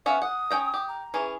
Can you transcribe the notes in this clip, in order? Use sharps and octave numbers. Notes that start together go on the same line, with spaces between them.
B3 C#4 E5 F5
F#5 D#6
C#4 G5 A#5
G4
A#5
E3 C#4 G#4